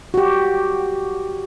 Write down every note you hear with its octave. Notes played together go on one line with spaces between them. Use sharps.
F#4 G4